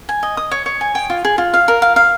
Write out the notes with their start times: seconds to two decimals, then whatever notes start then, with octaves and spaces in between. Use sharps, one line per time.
0.09 G#5
0.23 D#5
0.37 D#6
0.51 C#5
0.66 C#5
0.81 G#5
0.95 G5
1.10 F4
1.25 G#4
1.38 F4
1.54 F5
1.68 A#4
1.82 F5
1.96 F5